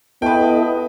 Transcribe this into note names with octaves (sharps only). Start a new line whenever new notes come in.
B3 E4 A4 B4 D#5 G5